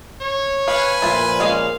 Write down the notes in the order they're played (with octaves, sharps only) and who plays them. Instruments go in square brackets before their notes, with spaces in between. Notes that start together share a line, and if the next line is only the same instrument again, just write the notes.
[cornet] C#5
[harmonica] B4 G#5 [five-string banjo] F5
[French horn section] A#2 F3 [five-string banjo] E4 F4
[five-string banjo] G#3 C#4 G#4 [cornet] F5